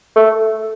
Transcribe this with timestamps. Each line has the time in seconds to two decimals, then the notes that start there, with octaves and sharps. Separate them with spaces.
0.16 A3